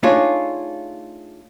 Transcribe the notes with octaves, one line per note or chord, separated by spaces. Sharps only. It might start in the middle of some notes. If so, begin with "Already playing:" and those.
A3 D4 D#4 F4 G#4 C#5